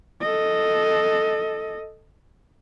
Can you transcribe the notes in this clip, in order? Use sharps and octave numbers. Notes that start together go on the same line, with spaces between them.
A4 D#5